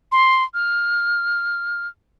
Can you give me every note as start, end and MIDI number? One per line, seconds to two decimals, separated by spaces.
0.12 0.43 84
0.54 1.87 89